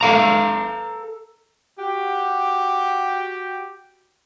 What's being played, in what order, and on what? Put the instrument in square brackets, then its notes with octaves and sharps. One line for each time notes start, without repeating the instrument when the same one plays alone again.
[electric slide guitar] A4 F5 A#5
[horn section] F#4 G4